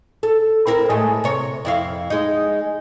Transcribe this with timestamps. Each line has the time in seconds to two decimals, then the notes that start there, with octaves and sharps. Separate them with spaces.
0.23 A4
0.67 C4 E4 A#4
0.90 A2 G#3 A3
1.24 C3 C#5
1.65 F2 E4 F5
2.10 G#3 D#4